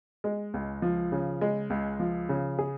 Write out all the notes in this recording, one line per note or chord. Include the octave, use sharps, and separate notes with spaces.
G#3
C#2
F3
C#3
G#3
C#2
F3
C#3
G#4